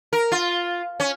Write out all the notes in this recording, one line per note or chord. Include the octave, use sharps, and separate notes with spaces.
A#4
F4
C#4